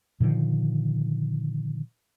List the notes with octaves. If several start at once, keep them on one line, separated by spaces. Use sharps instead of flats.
A#2 D3 D#3 F3